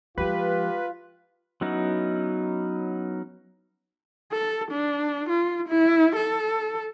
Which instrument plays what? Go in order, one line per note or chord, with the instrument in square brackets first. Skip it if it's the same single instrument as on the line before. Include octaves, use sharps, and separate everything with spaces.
[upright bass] F3 G#3 [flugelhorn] F4 [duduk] G4 [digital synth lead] B4
[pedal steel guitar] F#3 B3 C#4 D#4 E4
[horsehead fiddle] A4
D4
F4
E4
A4